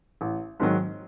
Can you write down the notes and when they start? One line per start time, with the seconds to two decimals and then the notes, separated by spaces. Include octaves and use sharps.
0.21 A1
0.60 G#2 D#3 F#3